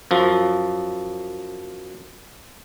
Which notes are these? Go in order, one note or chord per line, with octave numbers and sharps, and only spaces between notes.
F#2 F3